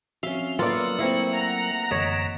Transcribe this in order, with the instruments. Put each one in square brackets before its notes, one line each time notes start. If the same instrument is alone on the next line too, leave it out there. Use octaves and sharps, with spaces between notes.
[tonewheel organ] F3 C4 F#4 [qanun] C#4 F5 [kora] E5
[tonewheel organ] F#3 A#4 E5 [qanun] A#3 B3 A4 [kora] F4 D5
[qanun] A3 A#3 C4 [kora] E4
[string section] F#5 A#5
[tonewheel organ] F#2 D3 E3 [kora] C#5 D#5